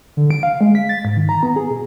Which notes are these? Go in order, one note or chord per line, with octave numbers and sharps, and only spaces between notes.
D3
D7
F5
G#3
B6
A6
G#2
D#3
A#5
B3
G#4
B2